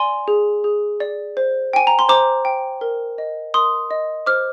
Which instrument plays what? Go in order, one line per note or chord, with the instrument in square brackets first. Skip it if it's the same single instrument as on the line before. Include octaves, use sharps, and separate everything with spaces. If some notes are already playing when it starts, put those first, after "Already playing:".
Already playing: [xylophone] D5 G#5 C6
G#4
G#4
D5
C5
G5 G#5
A#5
C6
C5 A#5 D6
G5
A#4
D#5
A#4 C6 D#6
D#5
C5 D6 F6